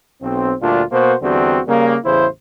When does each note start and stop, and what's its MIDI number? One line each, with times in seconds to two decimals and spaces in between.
0.22 0.53 35
0.22 0.53 60
0.62 0.82 38
0.62 0.82 46
0.62 0.82 55
0.62 0.82 62
0.62 0.82 65
0.91 1.14 47
0.91 1.14 58
0.91 1.14 66
0.91 1.14 72
1.22 1.60 40
1.22 1.60 50
1.22 1.60 55
1.22 1.60 60
1.22 1.60 66
1.68 1.96 49
1.68 1.96 55
1.68 1.96 58
2.04 2.26 33
2.04 2.26 40
2.04 2.26 49
2.04 2.26 64
2.04 2.26 72